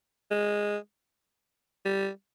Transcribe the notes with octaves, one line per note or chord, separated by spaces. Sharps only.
G#3
G3